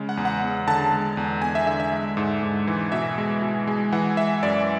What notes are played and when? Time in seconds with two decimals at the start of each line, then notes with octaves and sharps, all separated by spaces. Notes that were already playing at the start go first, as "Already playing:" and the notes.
Already playing: C#3 G#3
0.09 F#5
0.17 E2
0.25 F#5
0.43 E2
0.68 D3 A5
0.92 G#3
1.17 E2
1.42 E2 G#5
1.55 E5
1.67 D3 E5
1.80 E5
1.92 G#3
2.17 G#2
2.43 G#2
2.67 E3
2.92 B2 E5
3.18 G#3
3.42 B2
3.67 G#3
3.92 E3 F#5
4.17 G#3 E5
4.43 F#2 D5